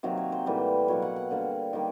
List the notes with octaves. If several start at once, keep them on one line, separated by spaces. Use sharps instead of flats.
C3 D#3 F#3 A#3
C#5
C5
A2 E3 G3 A#3
B2 F#3 A#3 C#5
F#5
F#5
D3 G3 A#3
D#3 G3 A#3